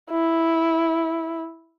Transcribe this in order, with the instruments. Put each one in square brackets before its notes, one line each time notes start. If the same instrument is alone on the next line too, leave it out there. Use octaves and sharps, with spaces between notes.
[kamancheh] E4